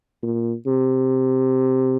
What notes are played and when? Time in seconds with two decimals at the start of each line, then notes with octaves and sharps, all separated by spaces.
0.23 A#2
0.67 C3